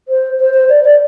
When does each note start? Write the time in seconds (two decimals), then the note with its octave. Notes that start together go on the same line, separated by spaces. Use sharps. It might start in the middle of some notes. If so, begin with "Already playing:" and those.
0.08 C5
0.39 C5
0.54 C5
0.69 D5
0.84 D5